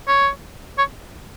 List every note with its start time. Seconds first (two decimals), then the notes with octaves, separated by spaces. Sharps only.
0.08 C#5
0.78 C#5